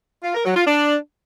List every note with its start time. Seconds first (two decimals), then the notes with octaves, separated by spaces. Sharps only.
0.24 F4
0.35 A#4
0.45 F#3
0.56 F4
0.67 D4